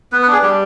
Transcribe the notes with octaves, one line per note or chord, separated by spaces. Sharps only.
B3 B4
B4
D4 G#4
G3 G4